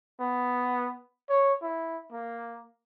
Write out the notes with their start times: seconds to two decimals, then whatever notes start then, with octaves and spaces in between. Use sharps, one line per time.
0.20 B3
1.29 C#5
1.62 E4
2.12 A#3